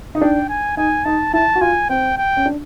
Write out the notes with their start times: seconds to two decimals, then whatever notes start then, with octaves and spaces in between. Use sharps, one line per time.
0.15 D#4
0.21 D4 G5
0.49 G#5
0.77 D#4 G#5
1.05 D#4 A5
1.33 E4 A5
1.55 F#4
1.61 F4 G#5
1.89 C4 G5
2.18 G5
2.37 C#4
2.46 D4